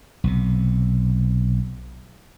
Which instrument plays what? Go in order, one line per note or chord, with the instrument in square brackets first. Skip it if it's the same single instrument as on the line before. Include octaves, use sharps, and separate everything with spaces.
[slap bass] B1 C3